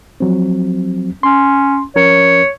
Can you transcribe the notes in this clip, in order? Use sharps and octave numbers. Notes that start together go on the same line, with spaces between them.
F3 F#3 C4
C#4 C6
F3 C#4 A#4 C#5